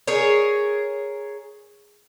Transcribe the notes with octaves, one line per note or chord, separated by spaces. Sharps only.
G#4 A#4 C#5